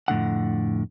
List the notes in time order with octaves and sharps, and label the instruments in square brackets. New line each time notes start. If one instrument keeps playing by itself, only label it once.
[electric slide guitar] F2 A2 D3 F#5